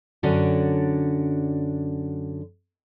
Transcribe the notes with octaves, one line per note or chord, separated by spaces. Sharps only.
F#2 D3 C#4 D4 F#4